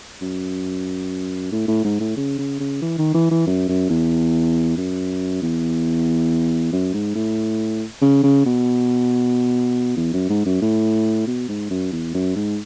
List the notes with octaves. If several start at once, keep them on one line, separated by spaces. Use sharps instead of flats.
F#2
A2
A2
G#2
A2
C#3
C#3
C#3
E3
D#3
E3
E3
F#2
F#2
E2
F#2
E2
F#2
G#2
A2
C#3
C#3
B2
E2
F#2
G#2
F#2
A2
B2
G#2
F#2
E2
F#2
G#2